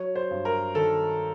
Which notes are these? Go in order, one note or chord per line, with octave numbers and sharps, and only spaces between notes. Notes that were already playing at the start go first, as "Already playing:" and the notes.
Already playing: F#3 C#5
C5
G2
A#4
D#3 A4